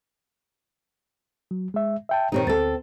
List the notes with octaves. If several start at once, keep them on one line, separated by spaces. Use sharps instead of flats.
F#3
G#3 E5
E5 G5 A5
A#2 D#3 C4 D#4 G4 C#5
D2 C4 A4 A6